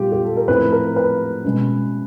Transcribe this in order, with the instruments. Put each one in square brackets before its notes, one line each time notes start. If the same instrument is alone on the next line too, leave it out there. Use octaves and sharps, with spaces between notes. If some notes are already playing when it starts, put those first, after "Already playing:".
Already playing: [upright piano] A#2 G3 B3 F4 G4
G4
A4
A#4
A2 F3 A3 C4 B4
A#4
B4
B2 G#3 C#4